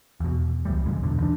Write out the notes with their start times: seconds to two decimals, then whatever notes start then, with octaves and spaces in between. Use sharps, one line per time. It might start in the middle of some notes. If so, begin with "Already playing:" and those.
0.20 E2 B2
0.65 C#2 E3 G3
0.86 A#1 F#2 C#3 G#3
1.03 E2 B2 D3
1.20 E3 D4